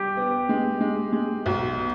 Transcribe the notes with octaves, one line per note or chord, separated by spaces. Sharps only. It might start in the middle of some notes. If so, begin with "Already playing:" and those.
Already playing: G3 G4
B3
G#3
G#3
G#3
B1
B2